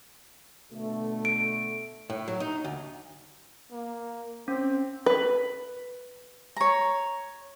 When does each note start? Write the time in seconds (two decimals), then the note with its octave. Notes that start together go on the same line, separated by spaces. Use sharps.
0.71 B2 D3 A3
1.25 D7
2.10 A2
2.28 F#3
2.40 D#4
2.64 D2
3.71 A#3
4.48 C4 C#4
5.06 B4
6.57 C#5 A#5